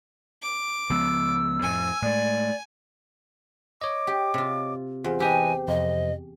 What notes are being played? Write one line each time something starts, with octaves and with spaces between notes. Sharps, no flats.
D6
C#2 F3 B3 E6
F2 A2 G#5
A2 G#3 D5
C#5 D#5 D6
G4
C3 F4
E2 F4 C5
E3 G4 B4 D#5 G#5
F2 C3 D#5